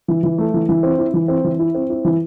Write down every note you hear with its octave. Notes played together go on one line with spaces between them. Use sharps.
E3
E3
A3
E3
E3
C4
E4
E3
C4
E3
E4
C4
E4
E3